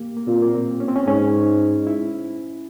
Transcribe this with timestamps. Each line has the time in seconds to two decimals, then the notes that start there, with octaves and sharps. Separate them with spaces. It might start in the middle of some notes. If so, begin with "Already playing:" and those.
Already playing: A#3 G4
0.17 A#3
0.27 A#2 C4
0.42 A#3
0.54 C4
0.80 C#4
0.88 C4
0.96 C#4
1.07 G#2 C#4
1.87 E4